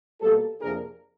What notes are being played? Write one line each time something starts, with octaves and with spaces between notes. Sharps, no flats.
B2 G3 A#3 G4 A4
F2 C3 F3 A#3 D4 G#4 A#4